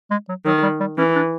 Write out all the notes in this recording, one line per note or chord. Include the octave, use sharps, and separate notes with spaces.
G#3
F#3
D#3 F#3
G3
G3
E3 C#4
D4